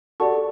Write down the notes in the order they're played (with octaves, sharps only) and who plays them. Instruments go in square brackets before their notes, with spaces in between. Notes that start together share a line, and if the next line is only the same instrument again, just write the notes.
[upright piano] F#4 A4 [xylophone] G4 D5 F#5 A5 C#6